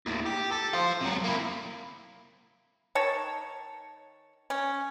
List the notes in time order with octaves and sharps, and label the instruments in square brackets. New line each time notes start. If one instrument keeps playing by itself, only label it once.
[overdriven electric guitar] D#2 A2
G4
A4
F4 C5
C3 F#3
A#3 E4
[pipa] D#3 C#5 A5
C#4